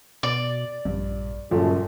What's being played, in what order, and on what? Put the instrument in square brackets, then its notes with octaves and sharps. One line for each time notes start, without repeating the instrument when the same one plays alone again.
[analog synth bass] B2 [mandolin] D5 [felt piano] A6
[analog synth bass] A#1 [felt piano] G2
[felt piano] G1 A#2 F3 [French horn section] F#2 A4 [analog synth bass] C#3